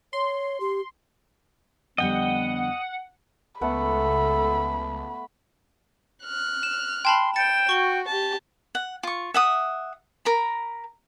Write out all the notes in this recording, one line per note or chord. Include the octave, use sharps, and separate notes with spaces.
C#5 C6
G4
F2 D3 G3 B3 D#5 F#5 G5
C#2 A3 B3 A4 F#5 B5
F6 F#6
E7
G5 A5 B5 C6
G5 A6 C#7 E7
F#4 C#6 G7
G4 A5
F#5
F4 C#6
E5 F#5 D#6
A#4 A#5 B5